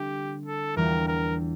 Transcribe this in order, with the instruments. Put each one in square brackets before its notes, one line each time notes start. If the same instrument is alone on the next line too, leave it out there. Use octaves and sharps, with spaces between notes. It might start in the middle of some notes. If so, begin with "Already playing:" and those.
Already playing: [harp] D3 G3 C4 E4 [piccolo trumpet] G4
[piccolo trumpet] A4
[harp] E2 E3 G3 D4 F4 [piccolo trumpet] A#4
[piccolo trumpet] A#4